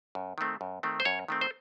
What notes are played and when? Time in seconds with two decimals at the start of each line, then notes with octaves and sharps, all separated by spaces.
0.15 F#2
0.38 D#3 A3 C4
0.61 F#2
0.83 D#3 A3 C4
1.00 C5
1.05 F#2 C#5
1.28 D#3 A3 C4
1.41 C5